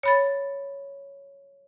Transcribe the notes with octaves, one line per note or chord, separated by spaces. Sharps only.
C#5 B5 A6